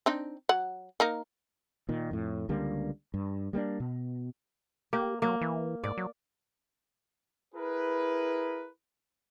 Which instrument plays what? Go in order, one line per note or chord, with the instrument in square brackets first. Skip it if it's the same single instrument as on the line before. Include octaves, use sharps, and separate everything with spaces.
[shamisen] C4 D4 D#4
F#3 F#5
A#3 D#4 A#4
[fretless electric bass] A#2 D#3
F2 A2
C#2 D3 G3 A#3
G2
G3 A#3 B3 D4
B2
[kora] A#3 [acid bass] G4
[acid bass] F#3 [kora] A#3
[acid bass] E3
[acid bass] G#2 [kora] D5
[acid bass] F#3
[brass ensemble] E4 G#4 A#4 B4